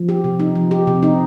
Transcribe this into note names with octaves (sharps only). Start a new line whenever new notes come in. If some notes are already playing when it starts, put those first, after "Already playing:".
Already playing: F3
G4
C3
D#4
F3
G4
C3
D#4